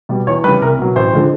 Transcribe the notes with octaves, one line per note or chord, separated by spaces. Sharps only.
B2 G3
E2 C#5
C#3 E3 G3 B4
C2 A#4
B2 F#3
A1 C5
D3 F3 G#3